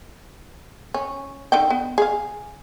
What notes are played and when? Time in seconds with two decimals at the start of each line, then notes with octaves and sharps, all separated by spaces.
0.94 C#4
1.52 D3 D#3 G5
1.70 B3
1.98 G#4 F5